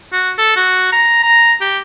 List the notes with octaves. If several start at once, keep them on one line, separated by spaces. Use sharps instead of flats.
F#4
A4
F#4
A#5
A#5
G4